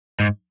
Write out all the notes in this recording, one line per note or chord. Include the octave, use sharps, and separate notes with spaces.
G#2